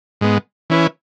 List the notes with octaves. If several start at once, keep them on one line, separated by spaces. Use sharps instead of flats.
G#2 G#3 B3
E3 C#4 E4 B4